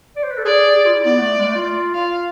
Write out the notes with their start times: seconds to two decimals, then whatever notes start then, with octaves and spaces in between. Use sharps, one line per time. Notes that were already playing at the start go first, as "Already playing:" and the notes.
0.16 D5
0.23 C5
0.31 B4
0.38 A4
0.45 G#4 D5
0.75 G#4
0.85 F4
0.95 E4
1.05 B3 D5
1.20 A3
1.39 G#3
1.45 A3
1.55 F4
1.94 F4 F5